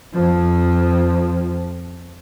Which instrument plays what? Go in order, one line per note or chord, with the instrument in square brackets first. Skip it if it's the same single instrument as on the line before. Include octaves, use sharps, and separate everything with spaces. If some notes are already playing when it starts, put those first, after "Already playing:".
[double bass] F2 F3